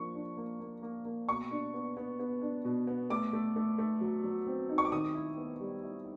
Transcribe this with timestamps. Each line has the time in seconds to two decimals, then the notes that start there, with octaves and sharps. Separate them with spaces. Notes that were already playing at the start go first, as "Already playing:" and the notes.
Already playing: F3 A#3 D4 C#6
0.15 D4
0.37 A#3
0.60 A#3
0.82 A#3
1.05 A#3
1.28 B2 C#6
1.51 D4
1.74 B3
1.97 B3
2.19 B3
2.42 D4
2.65 B2
2.87 B3
3.10 A3 D6
3.33 A3
3.56 A3
3.78 A3
4.01 F#3
4.24 F#3
4.47 C4
4.69 D#4
4.78 C#6
4.85 D6
4.92 D#3 D#6
5.15 E4
5.37 B3
5.60 G3
5.84 E4